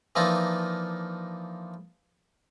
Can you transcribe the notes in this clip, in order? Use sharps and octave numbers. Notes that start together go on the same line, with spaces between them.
E3 F3 A#3 D4 D#4 F4